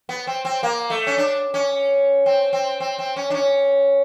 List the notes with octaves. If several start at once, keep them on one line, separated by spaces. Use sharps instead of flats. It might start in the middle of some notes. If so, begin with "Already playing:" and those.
B3
C4
C4
A#3
A3
C#4
D4
C#4
C4
C4
C4
C4
C#4
D4
C#4